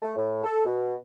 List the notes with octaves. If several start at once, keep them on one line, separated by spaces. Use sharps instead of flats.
A3
A2
A4
B2